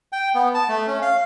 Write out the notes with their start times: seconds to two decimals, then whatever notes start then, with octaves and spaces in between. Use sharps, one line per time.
0.13 G5
0.35 B3
0.54 A5
0.68 A3
0.87 C#4
1.02 F5